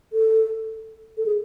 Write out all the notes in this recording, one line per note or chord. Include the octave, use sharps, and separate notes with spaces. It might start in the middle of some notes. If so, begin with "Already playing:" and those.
A4
A4
G#4